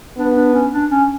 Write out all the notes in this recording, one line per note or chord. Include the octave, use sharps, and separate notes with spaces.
B3 D4
D4
C#4
D4
C#4